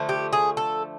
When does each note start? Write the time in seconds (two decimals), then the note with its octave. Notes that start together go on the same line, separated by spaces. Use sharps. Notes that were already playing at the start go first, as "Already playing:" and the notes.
Already playing: D3 F3 A3
0.09 G4
0.33 G#4
0.57 A4